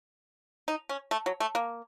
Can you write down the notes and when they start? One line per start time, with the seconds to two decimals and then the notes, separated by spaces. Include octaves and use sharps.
0.68 D#4
0.89 C#4
1.11 A3
1.26 F#3
1.40 A3
1.55 A#3